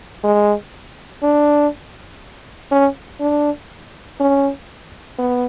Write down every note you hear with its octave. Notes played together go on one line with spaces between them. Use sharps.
G#3
D4
C#4
D4
C#4
B3